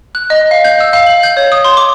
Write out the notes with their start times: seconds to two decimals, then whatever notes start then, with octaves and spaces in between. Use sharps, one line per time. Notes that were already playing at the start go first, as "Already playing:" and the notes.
0.15 F#6
0.30 D#5
0.51 F5
0.64 G6
0.80 E6
0.93 F5
1.07 F#7
1.23 G6
1.37 C#5
1.52 D#6
1.64 C6
1.77 D6